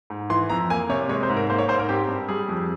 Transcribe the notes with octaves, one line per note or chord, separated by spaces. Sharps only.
G#2
E3 C6
F2 A#5
A#3 G#5
C3 C#5
G#3 C#5
C5
G#2
A#4
A#3 C5
C#5
G#2 C5
A#4
C4 G4
G2
G3 G#4
F2